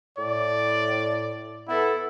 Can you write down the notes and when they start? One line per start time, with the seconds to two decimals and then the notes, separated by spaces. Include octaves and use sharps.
0.18 A2 D5
1.68 B3 E4 A4